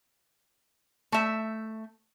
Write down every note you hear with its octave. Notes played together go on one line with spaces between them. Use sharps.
A3 E5